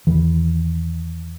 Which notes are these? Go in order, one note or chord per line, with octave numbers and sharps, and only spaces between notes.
E2 D#3 E3